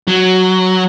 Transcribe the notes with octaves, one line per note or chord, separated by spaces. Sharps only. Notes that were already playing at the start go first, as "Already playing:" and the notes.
F#3